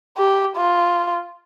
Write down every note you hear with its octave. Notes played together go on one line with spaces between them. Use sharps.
G4
F4